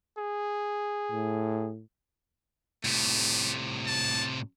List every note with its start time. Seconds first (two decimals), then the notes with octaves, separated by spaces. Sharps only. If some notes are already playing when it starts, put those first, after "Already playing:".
0.18 G#4
1.12 A2
2.85 A2 C3 A3
3.87 A5